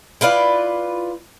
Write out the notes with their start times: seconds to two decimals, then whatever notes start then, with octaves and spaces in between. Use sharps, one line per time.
0.21 E4 F4 B4 D5